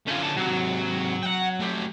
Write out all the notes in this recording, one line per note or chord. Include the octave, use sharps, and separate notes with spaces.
D3 A3 C#4 F4
E3 A5
G#2 C3 F#3
F#5 G5
A3 G4